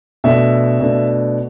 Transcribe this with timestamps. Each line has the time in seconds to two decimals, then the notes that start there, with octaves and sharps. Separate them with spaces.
0.24 B2 A3 D4 E5
0.80 B2 A3 D4